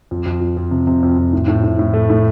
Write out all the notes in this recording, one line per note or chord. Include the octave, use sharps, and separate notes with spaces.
F2
F2
F2
F2
C3
C3
F2
F2
A2
A2
A2
A2
A3
A2